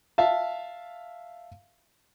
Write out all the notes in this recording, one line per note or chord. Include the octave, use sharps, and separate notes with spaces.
E5 F5 A5